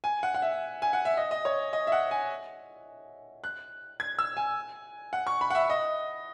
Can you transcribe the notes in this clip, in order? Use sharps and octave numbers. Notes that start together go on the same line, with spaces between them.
G#5
F#5
F#5
E5
G#5
F#5
E5
D#5
D#5
C#5
D#5
E5
F#5
G#5
F#6
G#6
E6
G#5
F#5
C#6
B5
F#5
E5
D#5